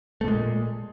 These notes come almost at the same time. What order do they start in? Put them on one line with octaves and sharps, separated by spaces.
A3 A#2 G#3